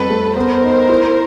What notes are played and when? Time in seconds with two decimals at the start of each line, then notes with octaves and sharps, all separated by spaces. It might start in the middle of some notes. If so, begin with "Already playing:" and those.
Already playing: F2 G3 C4 A4 B4
0.10 A3
0.36 B3 A#4 C5
0.63 D#4
0.89 E4